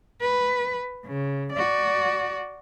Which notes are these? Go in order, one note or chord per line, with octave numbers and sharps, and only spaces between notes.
B4
C#3
F#4 D5